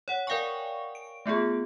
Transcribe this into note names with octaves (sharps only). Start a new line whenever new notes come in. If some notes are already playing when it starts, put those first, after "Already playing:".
C#5 F#5
A#4 D5 F5 G5 G#5 C#6
D7
A3 B3 F4 G#4